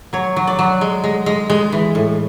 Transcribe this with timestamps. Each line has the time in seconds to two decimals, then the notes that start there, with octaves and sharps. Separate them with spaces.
0.13 F#3 C#5
0.36 F#3
0.47 D5
0.59 F#3
0.81 G#3
1.04 G#3
1.26 G#3
1.50 G#3
1.72 E3
1.95 A2